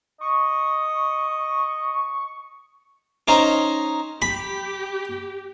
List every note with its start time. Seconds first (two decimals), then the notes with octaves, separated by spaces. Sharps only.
0.21 D#5 C#6
3.28 C#4 D#4 C5 D#5 A#5
4.22 G4 B5